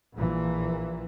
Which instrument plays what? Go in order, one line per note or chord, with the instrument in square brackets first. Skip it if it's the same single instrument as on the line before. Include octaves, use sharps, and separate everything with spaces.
[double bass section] A#1 A#2 E3